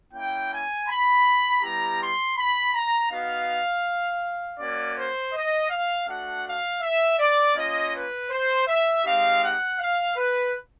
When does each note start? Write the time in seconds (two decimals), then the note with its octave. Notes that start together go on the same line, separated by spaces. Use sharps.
0.14 A#3 C#4 E4 G5
0.51 G#5
0.88 B5
1.62 G3 B3 E4 G4 A#5
1.99 C6
2.36 B5
2.74 A#5
3.10 B3 D#4 F#4 F5
4.59 A#3 C#4 F#4 D5
4.97 C5
5.34 D#5
5.70 F5
6.07 A3 D4 F#4 F#5
6.45 F5
6.81 E5
7.19 D5
7.56 A#3 C#4 F4 D#5
7.93 B4
8.30 C5
8.67 E5
9.04 G#3 C4 D#4 G4 F5
9.41 F#5
9.79 F5
10.16 B4